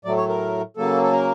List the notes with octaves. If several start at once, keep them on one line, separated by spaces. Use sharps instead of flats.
A2 F#3 A3 D5
C#5
A#4
C#3 F#3 A#3 A4
A4
A#4